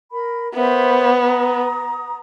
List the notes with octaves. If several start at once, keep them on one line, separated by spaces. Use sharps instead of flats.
A#4 B5
B3 A#4 C5 E5
A#5 D#6